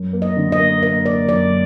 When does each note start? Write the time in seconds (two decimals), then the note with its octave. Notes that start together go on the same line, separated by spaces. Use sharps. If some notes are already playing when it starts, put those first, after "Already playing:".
Already playing: F#2
0.13 A#3
0.22 D#5
0.37 D3
0.52 D#5
0.59 A#3
0.83 A#3 D#5
1.05 A#3 D5
1.29 F#2 D5